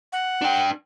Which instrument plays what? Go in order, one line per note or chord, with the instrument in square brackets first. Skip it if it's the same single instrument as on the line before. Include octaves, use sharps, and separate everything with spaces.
[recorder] F#5
[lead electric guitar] D4 G5